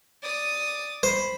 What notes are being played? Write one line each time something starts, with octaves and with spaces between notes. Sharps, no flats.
D5 D#6
C5 B5